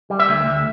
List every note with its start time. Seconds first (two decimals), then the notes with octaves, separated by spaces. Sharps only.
0.10 G3
0.20 E5
0.29 D2
0.46 D2